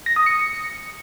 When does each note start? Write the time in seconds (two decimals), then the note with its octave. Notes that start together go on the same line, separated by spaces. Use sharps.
0.06 A#6
0.16 D#6
0.26 C#7